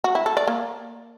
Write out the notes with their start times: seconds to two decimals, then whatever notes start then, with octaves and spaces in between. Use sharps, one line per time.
0.04 F#4
0.15 E4
0.26 A4
0.37 D5
0.47 A#3